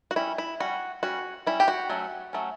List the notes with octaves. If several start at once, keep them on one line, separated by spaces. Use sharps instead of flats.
F#4
G3 C#4 E4
E4
G3 C#4 F#4
G3 C#4 F#4
G3 C#4 E4
G4
F#4
F#3 A3 C#4
F#3 A3 C#4